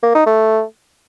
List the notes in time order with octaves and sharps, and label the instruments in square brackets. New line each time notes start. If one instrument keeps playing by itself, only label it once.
[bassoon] A#3
D#4
A3